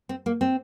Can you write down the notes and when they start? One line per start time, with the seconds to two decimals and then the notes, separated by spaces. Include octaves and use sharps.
0.09 C4
0.26 A#3
0.41 C4